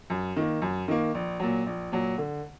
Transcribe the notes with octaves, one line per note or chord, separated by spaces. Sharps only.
F#2
D#3 A#3
F#2
D#3 A#3
A#1
A#2 F#3
A#1
A#2 F#3
D3